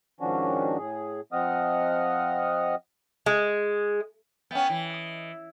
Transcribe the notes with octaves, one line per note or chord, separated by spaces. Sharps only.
G#2 D#3 F3 C#4 D4 F#4
A2 G#4
F3 C4 D#5 F#5 D#6 F6
G#3
B3 C#4 E5 G5
E3
D#5 D#6